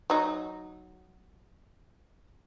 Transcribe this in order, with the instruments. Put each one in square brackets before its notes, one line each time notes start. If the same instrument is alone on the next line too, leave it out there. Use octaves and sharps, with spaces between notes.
[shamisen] F#3 D#4